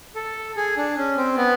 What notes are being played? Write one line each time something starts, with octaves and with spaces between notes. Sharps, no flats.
A4
G#4
D4
C#4
C4
B3